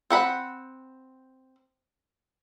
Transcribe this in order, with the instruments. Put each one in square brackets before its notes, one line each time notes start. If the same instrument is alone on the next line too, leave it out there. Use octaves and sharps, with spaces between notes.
[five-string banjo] C4 F#5 B5